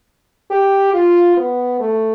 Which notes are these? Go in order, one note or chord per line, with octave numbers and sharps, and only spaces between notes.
G4
F4
B3
A3